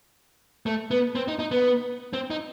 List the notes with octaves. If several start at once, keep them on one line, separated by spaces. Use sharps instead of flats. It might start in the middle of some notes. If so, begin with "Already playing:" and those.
A3
B3
C4
D#4
D#4
B3
C4
D#4